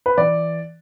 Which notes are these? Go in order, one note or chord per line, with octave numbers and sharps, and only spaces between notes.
B4
E3 D5